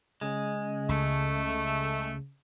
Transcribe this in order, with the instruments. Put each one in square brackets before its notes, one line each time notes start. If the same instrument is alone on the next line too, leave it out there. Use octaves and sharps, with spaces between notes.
[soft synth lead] C#3 [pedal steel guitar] G#3
[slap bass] C#2 [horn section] A3